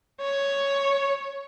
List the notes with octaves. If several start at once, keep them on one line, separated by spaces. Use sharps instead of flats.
C#5